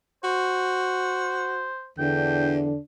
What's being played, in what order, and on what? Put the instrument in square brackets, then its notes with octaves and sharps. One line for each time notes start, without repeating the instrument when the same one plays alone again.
[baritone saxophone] F#4 [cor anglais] C5
[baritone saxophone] E2 [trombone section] D3 D4 [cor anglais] G5